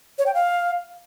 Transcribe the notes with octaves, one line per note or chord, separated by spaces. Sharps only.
C#5
G5
F5